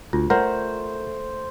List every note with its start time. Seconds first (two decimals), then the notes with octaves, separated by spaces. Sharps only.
0.13 D2 F4
0.30 A3 A#4 C5 D5 F#5